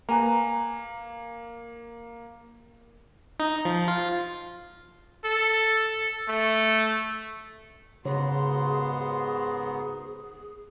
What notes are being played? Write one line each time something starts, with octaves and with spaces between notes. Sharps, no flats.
A#3 B4 G#5 A#5
D#4
F3
F4
A4
A3
D#2 G#2 C#3 B3 F#4 G#4 C6